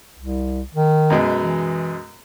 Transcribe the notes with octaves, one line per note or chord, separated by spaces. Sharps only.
C2
D#3
F#2 B2 G#3
E3